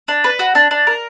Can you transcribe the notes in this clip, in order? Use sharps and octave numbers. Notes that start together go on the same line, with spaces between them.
D4
B4
F#4
D4
D4
A#4